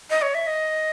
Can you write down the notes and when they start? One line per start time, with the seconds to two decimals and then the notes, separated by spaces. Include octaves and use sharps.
0.10 D#5
0.22 C#5
0.34 E5
0.47 D#5